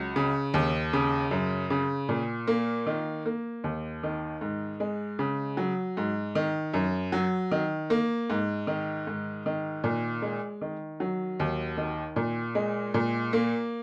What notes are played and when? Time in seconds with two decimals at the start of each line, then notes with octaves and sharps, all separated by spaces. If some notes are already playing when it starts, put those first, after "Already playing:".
Already playing: C#2 F#3
0.16 C#3
0.54 D#2
0.93 C#3
1.31 F#2
1.70 C#3
2.09 A#2
2.47 A#3
2.87 D#3
3.26 A#3
3.64 D#2
4.03 D#3
4.41 G#2
4.80 G#3
5.19 C#3
5.57 F#3
5.97 G#2
6.35 D#3
6.74 F#2
7.12 F#3
7.52 D#3
7.90 A#3
8.30 G#2
8.67 D#3
9.07 G#2
9.46 D#3
9.84 A#2
10.22 G#3
10.61 D#3
11.00 F#3
11.40 D#2
11.77 D#3
12.16 A#2
12.55 G#3
12.94 A#2
13.33 A#3